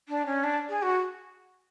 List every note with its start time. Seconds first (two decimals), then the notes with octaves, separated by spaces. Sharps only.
0.09 D4
0.26 C#4
0.44 D4
0.69 G#4
0.82 F#4